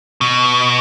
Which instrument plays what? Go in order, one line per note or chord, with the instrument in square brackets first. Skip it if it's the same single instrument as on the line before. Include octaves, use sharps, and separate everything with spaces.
[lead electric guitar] B2